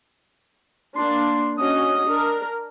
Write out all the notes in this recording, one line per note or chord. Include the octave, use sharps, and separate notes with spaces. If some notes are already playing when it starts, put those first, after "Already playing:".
A#3 D4 C6
C#4 F#4 D#5 D#6
D4 A#4